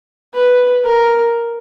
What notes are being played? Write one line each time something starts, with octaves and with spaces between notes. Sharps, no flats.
B4
A#4